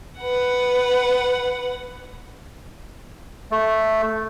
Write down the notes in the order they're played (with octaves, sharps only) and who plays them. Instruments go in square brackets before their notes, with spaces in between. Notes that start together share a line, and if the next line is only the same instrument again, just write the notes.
[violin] B4 F#5
[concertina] A3